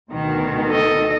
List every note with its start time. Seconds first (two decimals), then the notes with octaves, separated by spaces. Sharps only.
0.10 D2 B2 D#3
0.68 A4 D#5